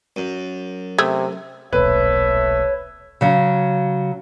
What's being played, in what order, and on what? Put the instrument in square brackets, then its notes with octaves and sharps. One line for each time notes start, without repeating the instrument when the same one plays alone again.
[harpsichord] F#2
[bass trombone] C3 [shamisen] A3 [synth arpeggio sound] D#6 E6 G#6
[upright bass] D#1 B1 [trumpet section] A3 E5 [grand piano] B4 [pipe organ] C#5
[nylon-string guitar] C#3 F#3